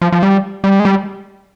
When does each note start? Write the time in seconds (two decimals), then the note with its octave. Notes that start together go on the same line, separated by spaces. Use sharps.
0.02 F3
0.12 F3
0.23 G3
0.64 G3
0.80 G#3
0.85 G3